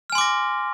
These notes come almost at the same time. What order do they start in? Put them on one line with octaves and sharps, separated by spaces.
F6 G#5 C6 D6 A#6